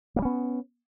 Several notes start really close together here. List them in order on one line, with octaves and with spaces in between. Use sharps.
A#3 G3 C#4 B3